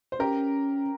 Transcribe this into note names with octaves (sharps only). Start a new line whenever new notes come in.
C5
C#4 G4 A#4